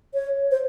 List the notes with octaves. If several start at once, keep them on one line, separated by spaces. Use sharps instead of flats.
C#5
C5